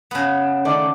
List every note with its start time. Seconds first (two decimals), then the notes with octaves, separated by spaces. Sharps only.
0.11 C#3 B3
0.65 D#3 A3 D5